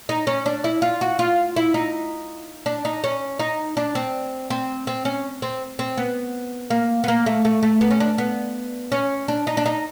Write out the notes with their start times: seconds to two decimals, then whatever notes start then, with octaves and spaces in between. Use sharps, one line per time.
0.09 D#4
0.27 C#4
0.46 D4
0.64 E4
0.82 F4
1.01 F#4
1.19 F4
1.56 E4
1.74 D#4
2.66 D4
2.85 D#4
3.04 C#4
3.39 D#4
3.77 D4
3.95 C4
4.50 C4
4.87 C4
5.05 C#4
5.42 C4
5.79 C4
5.97 B3
6.70 A#3
7.04 B3
7.08 A#3
7.26 A3
7.45 A3
7.63 A3
7.81 B3
7.91 C#4
8.00 D4
8.18 B3
8.92 C#4
9.28 D4
9.47 D#4
9.57 D4
9.66 D#4